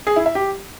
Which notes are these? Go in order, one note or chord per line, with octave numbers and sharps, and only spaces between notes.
G#4
E4
E5
G4